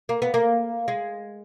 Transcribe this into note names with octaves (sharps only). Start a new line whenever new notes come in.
A#3
B3
A#3
G#3